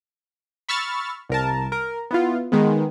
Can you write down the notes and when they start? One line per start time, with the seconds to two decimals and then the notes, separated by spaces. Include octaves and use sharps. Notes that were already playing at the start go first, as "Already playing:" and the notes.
0.69 B5 C#6 E6 F6 A6
1.29 C2 A#4 A5
1.72 A#4
2.11 B3 E4 F4
2.52 D#3 G#3 B3